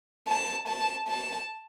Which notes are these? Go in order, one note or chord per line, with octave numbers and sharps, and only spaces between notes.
A5
A5
A5